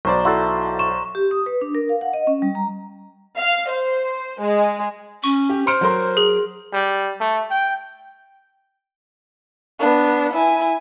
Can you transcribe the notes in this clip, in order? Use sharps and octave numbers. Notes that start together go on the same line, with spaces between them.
B1 C5 D5 A#5 C#6
E4 F#4 A4 C6
C6 C#6 E7
G4
D#6
B4
D4
A#4
F5
F#5
D#5
C#4
G3
A#5
F5
C5
G#3
C#4 C#6
G4
C5 C6 F6 C#7 D7
F#3 A#4 C6
G#4 F#7
G3
A3
G5
B3 D4
E4 G#5